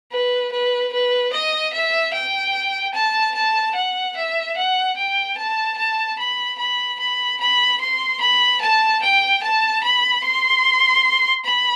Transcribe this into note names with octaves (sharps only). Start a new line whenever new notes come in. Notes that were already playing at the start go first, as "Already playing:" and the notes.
B4
B4
B4
D#5
E5
G5
A5
A5
F#5
E5
F#5
G5
A5
A5
B5
B5
B5
B5
C6
B5
A5
G5
A5
B5
C6
B5